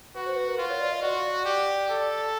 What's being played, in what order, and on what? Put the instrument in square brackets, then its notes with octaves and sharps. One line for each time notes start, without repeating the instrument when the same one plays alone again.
[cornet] F#4 [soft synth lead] B4
[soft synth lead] C5
B4
A#4
[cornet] F4 [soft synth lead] B4
[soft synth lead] C#5
D5
D#5
[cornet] F#4 [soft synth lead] D5
[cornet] G4
A4